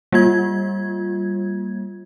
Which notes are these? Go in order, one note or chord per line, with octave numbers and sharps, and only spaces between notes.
G3 A#3 F4 G#6